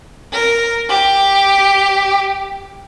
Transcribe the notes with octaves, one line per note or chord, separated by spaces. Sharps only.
A#4
G4